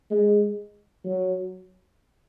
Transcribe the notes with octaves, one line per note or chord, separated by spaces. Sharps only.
G#3
F#3